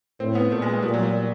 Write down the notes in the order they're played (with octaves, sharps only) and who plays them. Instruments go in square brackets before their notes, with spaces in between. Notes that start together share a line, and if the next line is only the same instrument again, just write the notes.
[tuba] A2 [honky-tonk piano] C4
[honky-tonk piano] B3
[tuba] A#2 [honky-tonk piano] A3
[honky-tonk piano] G#3
G#3
[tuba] A#2 [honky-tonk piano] G3
[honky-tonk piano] F#3
G3